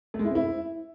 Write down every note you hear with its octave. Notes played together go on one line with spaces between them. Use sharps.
A3
G#3
E4
C4
E4